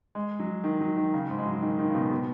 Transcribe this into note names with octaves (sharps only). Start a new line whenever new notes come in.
G#3
F#3
D#3
F#3
D#3
C#3
G#2
G#3
F#3
D#3
D#3
C#3
B2
B2